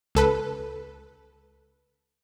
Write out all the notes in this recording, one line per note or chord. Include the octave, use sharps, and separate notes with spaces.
C#2 A4 B4